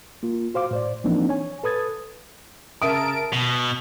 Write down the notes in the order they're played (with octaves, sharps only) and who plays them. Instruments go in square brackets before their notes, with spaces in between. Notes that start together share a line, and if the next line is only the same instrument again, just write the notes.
[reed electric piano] A#3 F4
F#4 C5 F5 D6
A2 C5 D5
E3 F3 A#3 C4 D4 D#4
C#5 G#5
A4 B4 D#6 G#6 A6
[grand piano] C#3 E5 D#6 [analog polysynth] A#4 A5 D7
[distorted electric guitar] B2